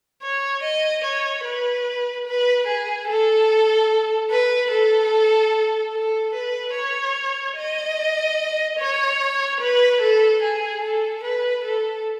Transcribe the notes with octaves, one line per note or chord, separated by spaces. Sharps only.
C#5
D#5
C#5
B4
B4
G#4
A4
B4
A4
A4
B4
C#5
D#5
C#5
B4
A4
G#4
A4
B4
A4